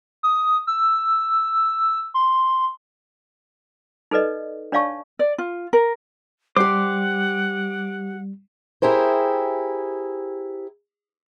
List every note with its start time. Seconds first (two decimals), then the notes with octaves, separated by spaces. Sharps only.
0.23 D#6
0.67 E6
2.14 C6
4.11 D#4 A4 B4 D5 D#5
4.72 D4 C#5 D5 F5 A5 C#6
5.19 D5
5.38 F4
5.73 A#4
6.57 G3 G4 C5 F#5 D6
8.82 E4 G4 G#4 A#4 C5